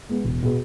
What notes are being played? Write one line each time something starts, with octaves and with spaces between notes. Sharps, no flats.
G#3 B3
E1
B2 B3 G#4